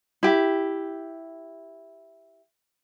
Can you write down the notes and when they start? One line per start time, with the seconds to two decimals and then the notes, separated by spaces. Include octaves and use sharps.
0.23 E4 G4